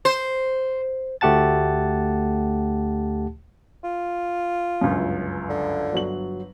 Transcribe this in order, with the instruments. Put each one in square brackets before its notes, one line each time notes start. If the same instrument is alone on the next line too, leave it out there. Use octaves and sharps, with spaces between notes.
[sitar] C5
[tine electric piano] D2 A3 G4 F#5 A5 A6
[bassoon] F4
[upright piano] G1 C#2 F#2
[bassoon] D3
[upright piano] G1 F#3 F#7